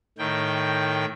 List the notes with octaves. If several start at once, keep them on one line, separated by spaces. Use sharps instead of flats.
A2 D#3 G5